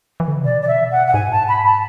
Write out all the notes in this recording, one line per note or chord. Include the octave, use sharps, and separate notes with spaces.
E3
D3
C#3
B2 D5
D5
E5
F#5
F#5
G#2 G#5
A5
B5
A5